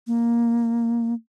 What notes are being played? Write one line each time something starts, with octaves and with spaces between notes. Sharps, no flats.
A#3